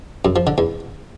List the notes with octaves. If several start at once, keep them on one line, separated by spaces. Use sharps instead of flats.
F#2
F3
D3
E2